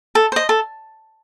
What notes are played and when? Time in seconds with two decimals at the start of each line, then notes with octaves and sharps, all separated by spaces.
0.15 A4
0.32 C5 D#5
0.49 A4